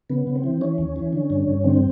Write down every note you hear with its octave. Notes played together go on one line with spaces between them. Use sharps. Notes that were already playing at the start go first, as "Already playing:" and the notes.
C#3 B3
C#3
C4
E3
E3 C#4
D#2
E3
D3
G2
G2
D3 C4